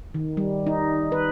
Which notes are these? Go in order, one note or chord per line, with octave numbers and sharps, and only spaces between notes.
D#3
G3
D#4
B4